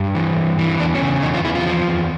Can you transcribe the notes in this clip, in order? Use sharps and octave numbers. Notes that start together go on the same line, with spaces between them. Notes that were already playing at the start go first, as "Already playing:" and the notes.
Already playing: G2
E3
G2
E3
E2 D4
C#4
C#3
E2 D#4
F4
E2 E4
F4
F3
E2